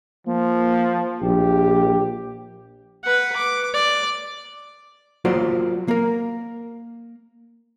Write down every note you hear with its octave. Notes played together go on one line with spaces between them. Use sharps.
F3 A#3
A#1 G4
B4 F#5
D6
D5
F#3 A#3 F4 F#4 C5 D5
A#3 A#4